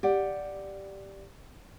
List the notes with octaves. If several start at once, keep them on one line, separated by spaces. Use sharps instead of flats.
G4 D5 F#5